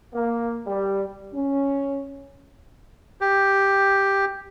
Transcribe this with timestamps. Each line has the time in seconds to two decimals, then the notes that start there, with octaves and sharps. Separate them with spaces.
0.14 A#3
0.67 G3
1.34 C#4
3.21 G4